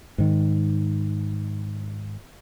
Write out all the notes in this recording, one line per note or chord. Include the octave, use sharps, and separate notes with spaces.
G#2 D#3